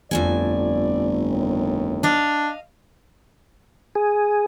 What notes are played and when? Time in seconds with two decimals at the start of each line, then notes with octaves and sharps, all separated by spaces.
0.11 G1 F2 A2 D5 G#5
1.30 D#2
2.03 D4 D#5 F5
3.95 G#4